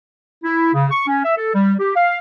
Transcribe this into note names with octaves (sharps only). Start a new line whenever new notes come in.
E4
C#3
C#6
C#4
E5
A4
G3
G4
F5